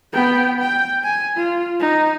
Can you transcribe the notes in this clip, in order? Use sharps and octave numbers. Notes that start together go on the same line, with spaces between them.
B3 G5
G5
G#5
F4
D#4